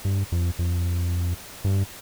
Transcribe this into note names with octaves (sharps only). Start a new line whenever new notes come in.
G2
F2
F2
G2